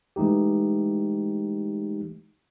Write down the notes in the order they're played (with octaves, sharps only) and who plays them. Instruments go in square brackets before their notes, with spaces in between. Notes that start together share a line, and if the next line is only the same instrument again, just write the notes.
[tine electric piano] E3 G#3 A3 D#4 G4